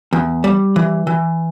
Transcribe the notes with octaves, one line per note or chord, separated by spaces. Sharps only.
E2
G3
E3
E3